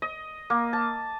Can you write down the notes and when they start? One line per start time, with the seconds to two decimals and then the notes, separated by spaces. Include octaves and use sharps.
0.02 D#5
0.50 A#3
0.73 A5